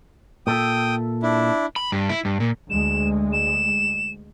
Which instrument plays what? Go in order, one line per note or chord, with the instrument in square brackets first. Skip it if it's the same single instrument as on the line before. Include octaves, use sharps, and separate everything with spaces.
[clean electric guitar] A#2 A4 E5 [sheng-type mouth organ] G5 D#6
[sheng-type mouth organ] D4 E4
[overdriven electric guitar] B5
G2
E4
G2
A#2
[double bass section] D2 G#3 [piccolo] E7
[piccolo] E7